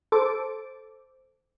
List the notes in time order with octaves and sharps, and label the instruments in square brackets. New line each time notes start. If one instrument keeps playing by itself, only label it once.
[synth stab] A4 C5 D6